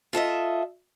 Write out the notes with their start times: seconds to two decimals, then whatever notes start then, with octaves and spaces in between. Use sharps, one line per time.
0.13 F4 A4 D#5 E5